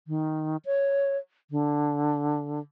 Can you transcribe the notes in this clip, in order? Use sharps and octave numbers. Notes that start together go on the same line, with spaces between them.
D#3
C#5
D3